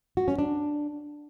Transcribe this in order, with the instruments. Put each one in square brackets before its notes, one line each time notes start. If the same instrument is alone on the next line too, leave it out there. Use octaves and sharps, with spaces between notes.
[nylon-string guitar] F#4
C#4
D4